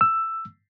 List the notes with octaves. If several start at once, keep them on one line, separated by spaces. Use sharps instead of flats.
E6